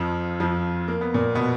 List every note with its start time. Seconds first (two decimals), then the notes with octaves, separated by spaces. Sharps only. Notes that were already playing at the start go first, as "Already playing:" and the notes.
Already playing: F2 F3
0.40 F2 F3
0.88 A#3
1.01 B3
1.14 A#2 A#3
1.35 B2 B3